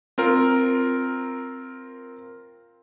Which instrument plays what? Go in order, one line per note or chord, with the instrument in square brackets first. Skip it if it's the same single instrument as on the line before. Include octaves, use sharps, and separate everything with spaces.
[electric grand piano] C4 F4 A#4